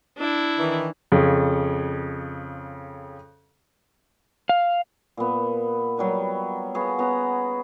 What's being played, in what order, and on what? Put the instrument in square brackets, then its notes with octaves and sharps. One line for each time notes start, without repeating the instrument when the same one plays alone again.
[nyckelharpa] D4 E4
[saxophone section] D#3 E3
[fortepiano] F2 C#3
[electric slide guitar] F5
[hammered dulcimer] A#2 B3
F#3 G3 B4
B3 F#4 G#4 F5
B3 C#4 F#4 A#5